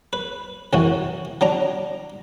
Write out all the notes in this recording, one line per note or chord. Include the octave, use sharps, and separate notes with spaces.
B4
C2 F#2 E3 F#4
F#3 D4 A#5